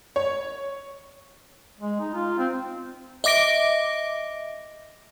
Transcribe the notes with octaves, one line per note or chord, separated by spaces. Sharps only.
C#5
G#3
D#4
F4
C4
D#5 E5 D6 A#6 D7